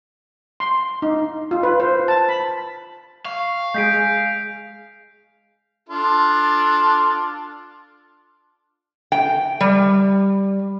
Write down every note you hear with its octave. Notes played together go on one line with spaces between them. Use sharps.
C6
D#4
F4
B4
C5
A5
B5
F5 C#6
G#3 G#4 G6 B6 D7
D4 F4 A4
G5
G3